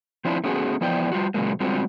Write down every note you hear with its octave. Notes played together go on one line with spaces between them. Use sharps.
F3 C4 D4 E4 F4
A3 B3 C#4 F#4 G#4
E2 F3 B3 E4 D5 G5
G3 F4 F#4
A#2 C#3 F#3 G#3 A#3
D3 G3 G#3 C4 F4 F#4